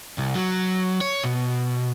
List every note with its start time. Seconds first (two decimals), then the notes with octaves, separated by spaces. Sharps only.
0.18 C2
0.35 F#3
1.01 C#5
1.23 B2